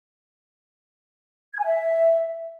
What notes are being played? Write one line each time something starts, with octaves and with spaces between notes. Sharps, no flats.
G#6
G#5
E5